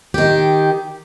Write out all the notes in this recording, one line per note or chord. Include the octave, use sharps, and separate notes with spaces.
D#3 G4